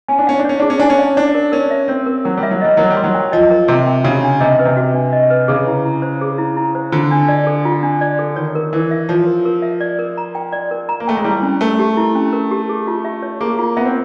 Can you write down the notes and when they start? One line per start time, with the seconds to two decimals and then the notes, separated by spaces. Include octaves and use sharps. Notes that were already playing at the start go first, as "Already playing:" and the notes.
0.08 C#4 G#5
0.19 D4
0.27 C#4 F5
0.39 D4
0.45 C#4 C#5
0.60 D4 G#4
0.70 C#4
0.79 D4 G#5
0.90 C#4
0.99 F5
1.17 D4 C#5
1.35 A#4
1.52 C#4 A#4
1.71 E5
1.88 C4 C#5
2.06 A#4
2.25 F#3 A#4
2.37 G3
2.43 E5
2.51 F#3
2.61 G3 D#5
2.77 F#3 A#4
2.90 G3
2.97 C6
3.04 F#3
3.14 G5
3.32 F3 D#5
3.51 A#4
3.68 C3 C6
3.86 G5
4.04 C#3 F#4
4.23 D4
4.40 C3 D#5
4.59 B4
4.65 C3
4.77 F#4
4.94 D4
5.13 D#5
5.30 B4
5.48 C#3 G#4
5.67 E4
5.85 E4
6.02 C5
6.21 G#4
6.38 E4
6.57 E4
6.75 C5
6.92 D3 F4
7.11 D4
7.28 D5
7.47 A4
7.65 F4
7.83 D4
8.01 D5
8.19 A4
8.36 D#3 C#5
8.55 A#4
8.73 E3 A#4
8.91 E5
9.09 F3 C#5
9.26 A#4
9.45 A#4
9.62 E5
9.81 D5
9.99 A#4
10.17 A#5
10.35 G5
10.52 D5
10.71 A#4
10.89 A#5
11.00 A#3
11.08 A3 G5
11.17 G#3
11.24 G3 E4
11.42 C#4
11.61 A3 A#4
11.79 G4
11.97 E4
12.15 C#4
12.33 A#4
12.51 G4
12.69 G#4
12.87 F4
13.05 E5
13.23 C#5
13.40 A#3 G#4
13.59 F4
13.77 B3 E5
13.85 C4